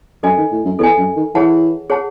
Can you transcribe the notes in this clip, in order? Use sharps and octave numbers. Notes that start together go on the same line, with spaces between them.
F#2 A4 D#5 G#5
D#3
A2
F#2
E2 A4 D#5 G#5
F#2
D#3
E3 G#4 C#5 F#5 A5
G#4 C#5 F#5 A5